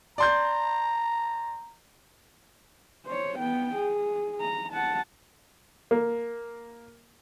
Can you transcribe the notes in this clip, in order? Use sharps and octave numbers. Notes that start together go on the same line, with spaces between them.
D5 A#5 C6 G6
C5 C#5
B3 G5
G#4
A#5
F#5 A5
A#3